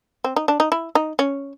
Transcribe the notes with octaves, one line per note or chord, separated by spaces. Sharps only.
C4
D#4
D4
D#4
E4
D#4
C#4